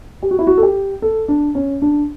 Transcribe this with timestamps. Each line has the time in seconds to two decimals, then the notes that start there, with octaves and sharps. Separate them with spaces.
0.23 G4
0.31 F#4
0.39 E4
0.47 F#4
0.58 A4
0.63 G4
1.02 A4
1.28 D4
1.55 C#4
1.82 D4